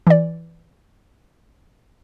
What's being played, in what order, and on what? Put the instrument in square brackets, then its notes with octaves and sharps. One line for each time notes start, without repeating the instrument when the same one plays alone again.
[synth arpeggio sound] E3 D5